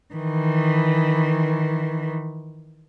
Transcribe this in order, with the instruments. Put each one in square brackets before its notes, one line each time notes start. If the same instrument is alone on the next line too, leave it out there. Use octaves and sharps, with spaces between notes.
[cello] D#3 E3